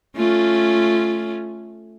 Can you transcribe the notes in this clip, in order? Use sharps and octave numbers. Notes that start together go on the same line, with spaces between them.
A3 C#4 F4